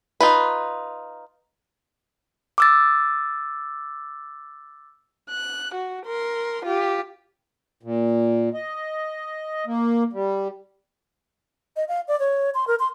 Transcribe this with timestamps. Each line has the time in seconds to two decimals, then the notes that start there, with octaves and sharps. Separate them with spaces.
0.21 D#4 F4 B4
2.58 D6 E6 A6
5.30 F#6
5.74 F#4
6.06 A#4 C6
6.65 F4 G4
7.83 A#2
8.54 D#5
9.66 A#3
10.13 G3
11.76 D#5
11.88 F5
12.08 D5
12.20 C#5
12.55 C6
12.68 A#4
12.79 C6